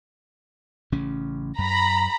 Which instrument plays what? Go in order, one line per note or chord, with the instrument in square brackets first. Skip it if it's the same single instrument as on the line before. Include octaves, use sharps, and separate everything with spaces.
[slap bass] A1 C#3 C#4
[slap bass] F#2 [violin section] A#5 B5